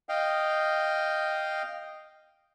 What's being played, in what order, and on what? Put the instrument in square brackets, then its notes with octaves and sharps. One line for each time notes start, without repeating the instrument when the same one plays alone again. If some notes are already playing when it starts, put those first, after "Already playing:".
[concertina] D#5 F5 G5